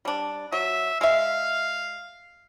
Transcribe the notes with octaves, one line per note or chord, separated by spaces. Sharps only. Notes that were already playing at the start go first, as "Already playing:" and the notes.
G3 D4
F#3 E5
G#3 E5 F5